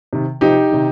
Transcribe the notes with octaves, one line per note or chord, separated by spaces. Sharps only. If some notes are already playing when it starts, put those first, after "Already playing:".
C3 D#3
C3 F3 D#4 G4
C3 D#3